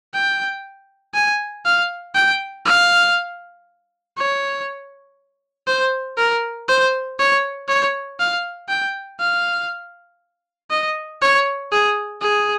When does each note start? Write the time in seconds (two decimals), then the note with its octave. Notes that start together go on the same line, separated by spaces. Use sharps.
0.14 G5
1.14 G#5
1.65 F5
2.15 G5
2.65 F5
4.17 C#5
5.67 C5
6.17 A#4
6.68 C5
7.19 C#5
7.68 C#5
8.19 F5
8.69 G5
9.20 F5
10.70 D#5
11.22 C#5
11.72 G#4
12.21 G#4